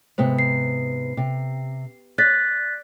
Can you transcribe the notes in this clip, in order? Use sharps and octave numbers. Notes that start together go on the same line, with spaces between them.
G#2 C3 B3 C5
C7
C3
D5 F#6 A6 B6